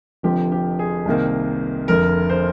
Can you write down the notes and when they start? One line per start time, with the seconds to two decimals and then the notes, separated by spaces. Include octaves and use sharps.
0.23 F1 F2 D3 F3 G4
0.52 G4
0.79 G#4
1.05 C2 C3 D#3 A#3
1.88 F1 F2 D3 A#4
2.29 C5